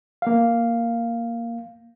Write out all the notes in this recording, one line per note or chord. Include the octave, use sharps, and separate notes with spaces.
A#3 F5